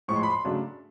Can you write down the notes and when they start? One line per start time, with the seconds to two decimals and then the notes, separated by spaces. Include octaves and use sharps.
0.08 A2 F3 G#3 C#6
0.16 C6
0.23 B5
0.30 C6
0.44 C#3 F#3 A3 D4